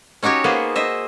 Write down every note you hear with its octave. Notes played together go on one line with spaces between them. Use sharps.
C#4 D#4 F#4 G4 C#5
A#3 B3 G#4 C5
C5 D#5 E5